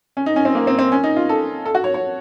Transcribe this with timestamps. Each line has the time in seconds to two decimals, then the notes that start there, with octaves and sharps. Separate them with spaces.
0.17 C#4
0.26 D#4
0.36 C#4
0.45 C4
0.55 A#3
0.67 C4
0.79 C4
0.92 C#4
1.04 D#4
1.16 F4
1.29 A4
1.66 A4
1.75 F#4
1.84 C#5
1.94 C#5